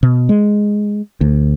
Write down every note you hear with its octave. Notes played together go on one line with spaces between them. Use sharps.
B2
G#3
D2